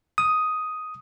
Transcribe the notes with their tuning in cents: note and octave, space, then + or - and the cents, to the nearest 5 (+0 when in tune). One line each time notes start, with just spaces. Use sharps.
D#6 +5